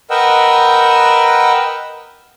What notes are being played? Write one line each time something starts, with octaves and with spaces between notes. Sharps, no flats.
A#4 B4 D#5 F#5 G5 E6